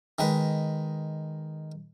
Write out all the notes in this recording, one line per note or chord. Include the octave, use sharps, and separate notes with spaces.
D#3 G#3 B4